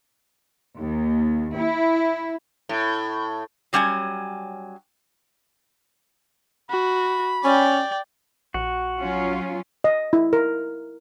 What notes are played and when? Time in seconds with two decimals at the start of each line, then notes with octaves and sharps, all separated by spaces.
0.77 D#2
1.56 E4
2.69 A2
3.73 F#3 G3 C#4 F#5 G#5
6.70 F#4 B5
7.44 C#4 D5 G5
8.54 A#1 F#4
8.99 F#3 C#4 F4
9.84 D#5
10.13 E4
10.33 A#4